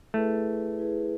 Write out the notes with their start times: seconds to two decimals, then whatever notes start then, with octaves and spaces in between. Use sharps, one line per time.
0.14 A3 E4 G#4 B4
0.79 E4 G#4 B4